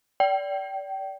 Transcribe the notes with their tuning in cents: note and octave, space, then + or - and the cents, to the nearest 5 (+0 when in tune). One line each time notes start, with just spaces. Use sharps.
D5 -25 G5 -25